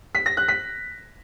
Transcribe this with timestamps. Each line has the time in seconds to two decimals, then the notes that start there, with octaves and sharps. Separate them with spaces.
0.15 B6
0.26 A#6
0.37 F#6
0.48 B6